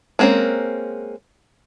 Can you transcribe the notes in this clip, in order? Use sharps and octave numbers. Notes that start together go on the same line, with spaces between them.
G#3 A#3 C4 C#4 A#4